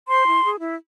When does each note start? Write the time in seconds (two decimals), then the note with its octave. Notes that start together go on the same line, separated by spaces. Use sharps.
0.08 C5 C6
0.26 E4
0.44 G#4
0.60 E4